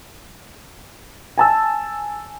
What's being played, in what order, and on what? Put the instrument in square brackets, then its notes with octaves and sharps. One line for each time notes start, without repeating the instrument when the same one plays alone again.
[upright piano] G#5 A5 E6